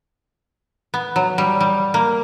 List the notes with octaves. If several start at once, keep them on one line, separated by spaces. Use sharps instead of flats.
B3
F#3
G3
G3
A#3